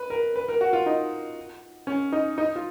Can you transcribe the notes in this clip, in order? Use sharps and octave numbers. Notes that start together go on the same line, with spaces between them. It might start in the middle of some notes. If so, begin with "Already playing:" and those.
Already playing: B4
A#4
B4
A#4
F#4
F4
D#4
C#4
D#4
D#4
F4